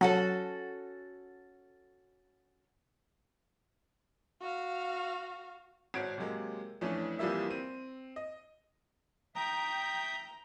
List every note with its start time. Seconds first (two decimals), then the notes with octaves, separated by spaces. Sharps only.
0.01 F#3 C#4 F#4 A4
4.41 F#4 F5
5.94 G#1 F#4 C#5 G#6 D7
6.18 C3 F#3 G#3 A#3
6.81 F2 E3 A3 C#4 D4
7.19 C2 E3 F3 G3 A#3 E5
7.50 C4 D#7
8.16 D#5
9.35 E5 G5 A#5 D#6 G6